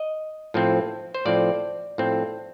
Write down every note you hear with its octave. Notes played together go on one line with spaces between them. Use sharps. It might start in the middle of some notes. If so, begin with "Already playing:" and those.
Already playing: D#5
A2 F3 C4
C5
A2 F3 C4 D5
A2 F3 C4